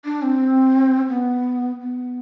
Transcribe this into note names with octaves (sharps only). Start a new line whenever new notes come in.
D4
C4
B3
B3